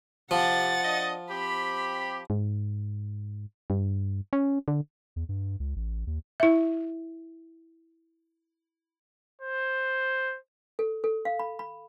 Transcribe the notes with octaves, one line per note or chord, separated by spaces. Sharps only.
C3 F3 F#5 A6
D4 D#5
C4 G4 B5
G#2
G2
C#4
D3
E2
G2
C#2
A1
D#2
E4 E5
C5
A4
A4
F5
B5
B5